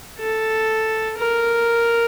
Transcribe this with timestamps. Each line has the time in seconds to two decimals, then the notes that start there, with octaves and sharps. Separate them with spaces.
0.19 A4
1.18 A#4